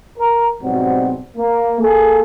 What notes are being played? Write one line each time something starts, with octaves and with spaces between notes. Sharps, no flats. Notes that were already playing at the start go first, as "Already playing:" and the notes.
A#4
G#2 B2 F#3 G3 C4 F#4
A#3
A#3 G#4 A4